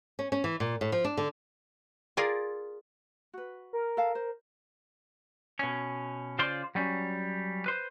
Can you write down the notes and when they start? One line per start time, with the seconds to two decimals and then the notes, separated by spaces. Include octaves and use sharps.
0.19 C#4
0.32 C#4
0.44 E3
0.60 A#2
0.81 A2
0.92 F3
1.05 D4
1.17 D3
2.17 F4 G#4 A#4 D5
3.33 F#4 B4
3.73 A#4
3.97 A4 F5 A5
4.15 C5
5.59 B2 C#4
6.39 C#3 F4 C5 D5 C6
6.75 F#3 G3 C#4
7.66 B4 C5